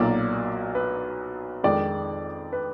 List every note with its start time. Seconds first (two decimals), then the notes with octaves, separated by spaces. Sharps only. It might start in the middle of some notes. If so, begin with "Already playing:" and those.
Already playing: B1 A#2 F#3 A#3 D5
0.75 B4
1.64 F2 D#3 G#3 D5
2.53 B4